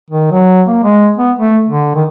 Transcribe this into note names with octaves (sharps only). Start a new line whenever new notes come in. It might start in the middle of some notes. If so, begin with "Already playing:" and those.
D#3
F#3
A#3
G#3
B3
A3
D3
D#3